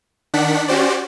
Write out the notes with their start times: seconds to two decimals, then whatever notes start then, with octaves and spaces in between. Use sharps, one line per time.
0.34 D#3 D4 F#5 B6
0.68 C#4 F#4 G4 C5 D5